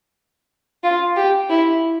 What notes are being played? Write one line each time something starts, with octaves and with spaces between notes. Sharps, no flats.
F4
G4
E4